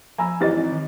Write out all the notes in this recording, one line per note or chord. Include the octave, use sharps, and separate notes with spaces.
F3 G#5 A#5 B5 E6
G#1 E3 G4 D#5 A6
C4
D#3